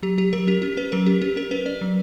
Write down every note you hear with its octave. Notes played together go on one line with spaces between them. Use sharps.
F#3 G4
F#3 G4
F#3 A#4
C#4 G4
C#4 G4
C#4 B4
F#3 A#4
C#4 G4
C#4 G4
C#4 A#4
C#4 B4
C#4 D5
F#3